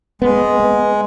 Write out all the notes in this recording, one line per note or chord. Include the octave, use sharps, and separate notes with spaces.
G#3 B3
B3